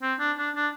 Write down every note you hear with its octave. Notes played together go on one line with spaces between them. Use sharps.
C4
D4
D4
D4